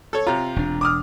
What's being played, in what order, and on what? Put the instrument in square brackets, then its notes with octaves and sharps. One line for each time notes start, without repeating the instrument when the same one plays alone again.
[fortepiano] A4 C#5
[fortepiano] C3 F4 [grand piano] A#5
[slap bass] E1 D4
[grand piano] D6 D#6 F6